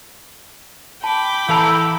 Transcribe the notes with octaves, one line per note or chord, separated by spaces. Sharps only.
G5 A5 B5 D6
E3 E4 A4 F5 A5 A#5